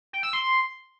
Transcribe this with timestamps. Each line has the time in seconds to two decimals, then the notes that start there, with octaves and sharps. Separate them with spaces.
0.13 G5
0.23 E6
0.33 C6